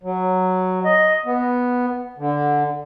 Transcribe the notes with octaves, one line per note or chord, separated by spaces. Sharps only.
F#3
D#5
B3
D3